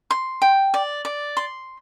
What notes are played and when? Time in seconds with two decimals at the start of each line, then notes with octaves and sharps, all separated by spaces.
0.11 C6
0.42 G5
0.74 D5
1.05 D5
1.37 C6